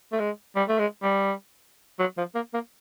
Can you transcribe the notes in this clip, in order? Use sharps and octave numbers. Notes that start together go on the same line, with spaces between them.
A3
G#3
G3
A3
G#3
G3
F#3
F3
A#3
A#3